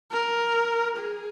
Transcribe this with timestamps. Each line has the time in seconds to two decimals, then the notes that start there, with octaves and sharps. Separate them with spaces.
0.11 A#4
0.96 G#4